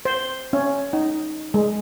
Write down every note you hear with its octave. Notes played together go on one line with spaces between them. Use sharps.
C5
C#4
D#4
G#3